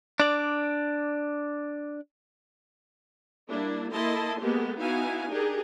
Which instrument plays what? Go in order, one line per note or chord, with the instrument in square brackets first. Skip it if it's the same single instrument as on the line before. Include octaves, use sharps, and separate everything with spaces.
[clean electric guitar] D4 D5
[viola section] G3 A#3 D4 E4
A#3 E4 A4 D#5 A5 C6
G#3 A#3 B3 G4 A4
B3 D#4 E4 F#4 F5 G#5
D4 D#4 G4 G#4 A#4